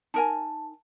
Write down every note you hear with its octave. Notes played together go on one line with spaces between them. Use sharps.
D#4 A#4 G#5 A5